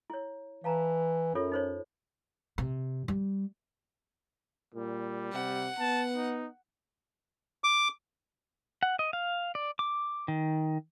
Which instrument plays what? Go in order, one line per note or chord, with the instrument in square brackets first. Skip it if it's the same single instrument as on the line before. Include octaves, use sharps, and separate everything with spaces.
[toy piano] E4 C#5
[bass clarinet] E3 [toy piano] F5 A5 A#5
[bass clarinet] F#2 [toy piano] F4 A4 C#5
[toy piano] D#4 C5 C#5
[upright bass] C3
G3
[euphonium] A#2 [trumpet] G3
[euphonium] C3 [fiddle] F#5
[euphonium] B3 [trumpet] A5
[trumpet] D#4
[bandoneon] D6
[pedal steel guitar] F#5
D#5
F5
D5
D6
D#3